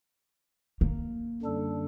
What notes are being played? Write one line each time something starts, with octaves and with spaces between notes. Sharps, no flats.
A#3
F#2 D3 G3 D4 A4